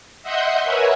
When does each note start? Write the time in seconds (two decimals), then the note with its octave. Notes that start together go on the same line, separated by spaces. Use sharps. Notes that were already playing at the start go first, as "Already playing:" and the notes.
0.23 D#5 E5 F#5 C6 G6
0.64 A#4 B4 C#5 E5 F#5 G#5